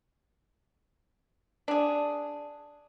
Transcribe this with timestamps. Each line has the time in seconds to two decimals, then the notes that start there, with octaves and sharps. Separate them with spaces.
1.68 D4 G#4